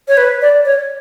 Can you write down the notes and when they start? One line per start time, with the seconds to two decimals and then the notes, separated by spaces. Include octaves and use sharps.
0.08 C#5
0.17 B4
0.42 D5
0.65 C#5